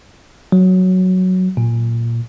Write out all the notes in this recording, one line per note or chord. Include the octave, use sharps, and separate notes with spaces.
F#3
A#2